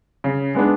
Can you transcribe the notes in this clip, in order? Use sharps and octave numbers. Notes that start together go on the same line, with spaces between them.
C#3
G#3 B3 D4